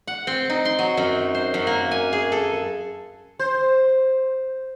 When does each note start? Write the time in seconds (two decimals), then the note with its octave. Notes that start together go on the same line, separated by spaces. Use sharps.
0.07 F#5
0.27 C4
0.50 D#4
0.65 C6
0.79 F#3
0.97 F#2
1.35 C5
1.54 F#2
1.67 A#3
1.91 G#5
2.13 G#4
2.32 A4
3.39 C5